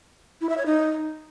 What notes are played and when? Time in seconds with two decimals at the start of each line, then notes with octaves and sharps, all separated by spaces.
0.41 E4
0.49 E5
0.58 C#5
0.66 D#4